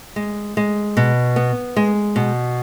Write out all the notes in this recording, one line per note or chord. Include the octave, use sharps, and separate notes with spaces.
G#3
G#3
B2
B3
G#3
B2